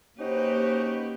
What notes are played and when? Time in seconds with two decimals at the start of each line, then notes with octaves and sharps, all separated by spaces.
0.19 A#3 C#4 D#4 F#4 G4 B4 C5